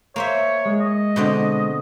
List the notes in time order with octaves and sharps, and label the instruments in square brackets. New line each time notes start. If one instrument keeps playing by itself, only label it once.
[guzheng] A#3 C5 E5 [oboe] C#5
[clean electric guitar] G#3
[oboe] D#5
[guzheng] B2 D3 C4